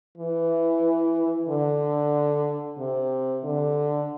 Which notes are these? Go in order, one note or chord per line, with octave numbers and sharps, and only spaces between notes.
E3
D3
C3
D3